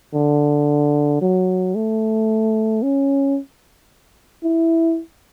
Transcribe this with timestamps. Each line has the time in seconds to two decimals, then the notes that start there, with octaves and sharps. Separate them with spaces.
0.14 D3
1.21 F#3
1.75 A3
2.83 C#4
4.44 E4